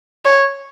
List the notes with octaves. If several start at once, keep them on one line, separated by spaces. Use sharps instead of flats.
C#5